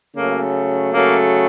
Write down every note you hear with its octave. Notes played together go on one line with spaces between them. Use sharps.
C#3 F#3 A3 A#3
C#3 F#3 A3 A#3